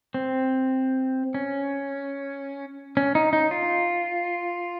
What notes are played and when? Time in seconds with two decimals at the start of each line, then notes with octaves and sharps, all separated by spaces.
0.14 C4
1.34 C#4
2.97 C#4
3.15 D#4
3.33 D#4
3.51 F4